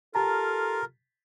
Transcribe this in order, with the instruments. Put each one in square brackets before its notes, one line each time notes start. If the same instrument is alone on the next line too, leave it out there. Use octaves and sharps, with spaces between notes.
[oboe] F4 [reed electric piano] G4 A5 A#5 [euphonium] A4 [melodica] A#4